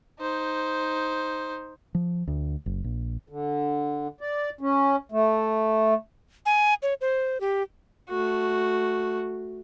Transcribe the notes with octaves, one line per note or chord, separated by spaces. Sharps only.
D#4 C5
F3
D2
F#1
A#1
D3
D5
C#4
A3
G#5
C#5
C5
G4
A3 F#4